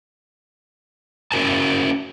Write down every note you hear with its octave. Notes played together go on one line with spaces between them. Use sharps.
C#4 E4 F#4 A#4 G#5 A5